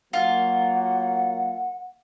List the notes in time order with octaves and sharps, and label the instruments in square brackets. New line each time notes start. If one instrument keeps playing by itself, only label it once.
[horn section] F#3 A#3 [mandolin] F4 [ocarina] F#5